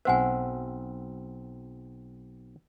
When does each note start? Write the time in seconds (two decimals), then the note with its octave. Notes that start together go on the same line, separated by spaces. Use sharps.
0.05 B1 C4 C5 E5 F#5 G#5